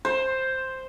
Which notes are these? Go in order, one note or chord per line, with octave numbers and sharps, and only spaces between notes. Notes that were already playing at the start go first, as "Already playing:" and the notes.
C5